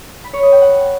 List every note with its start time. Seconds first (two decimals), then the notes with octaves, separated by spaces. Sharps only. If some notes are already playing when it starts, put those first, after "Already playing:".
0.24 B5
0.33 C#5
0.43 D#5
0.52 G5
0.62 F#5